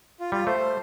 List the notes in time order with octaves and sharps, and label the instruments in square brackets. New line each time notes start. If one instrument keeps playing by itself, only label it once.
[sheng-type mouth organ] F4
[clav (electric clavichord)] G3 [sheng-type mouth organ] F4
[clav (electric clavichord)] A3 [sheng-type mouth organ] C5